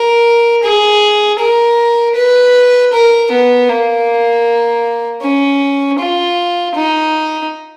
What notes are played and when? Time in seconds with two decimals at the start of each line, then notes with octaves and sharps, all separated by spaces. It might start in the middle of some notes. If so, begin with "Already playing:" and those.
Already playing: A#4
0.63 G#4
1.39 A#4
2.16 B4
2.93 A#4
3.31 B3
3.69 A#3
5.22 C#4
5.99 F4
6.75 D#4